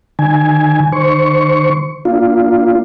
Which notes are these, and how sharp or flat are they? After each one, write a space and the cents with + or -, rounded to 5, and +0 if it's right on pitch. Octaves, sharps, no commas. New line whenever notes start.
D#3 -40 G#5 +0
D#3 -40 C5 +0 C#6 +10
A#3 +15 D4 +0 F4 +0